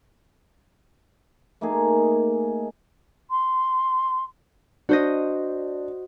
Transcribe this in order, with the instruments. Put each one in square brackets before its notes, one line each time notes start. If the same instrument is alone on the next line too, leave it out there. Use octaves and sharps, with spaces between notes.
[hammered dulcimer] A3 A#3 D#4 G#4
[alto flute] C6
[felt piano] D4 [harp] F#4 C5 D#5